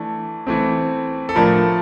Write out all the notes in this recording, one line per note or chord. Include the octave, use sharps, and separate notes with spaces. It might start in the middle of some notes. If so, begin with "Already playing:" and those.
Already playing: E3 A3 D4
E3 A3 C4
A4
A2 F3 A3 D4 A#4